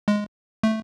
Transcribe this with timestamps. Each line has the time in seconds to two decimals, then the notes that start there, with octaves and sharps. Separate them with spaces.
0.08 G#3
0.63 A3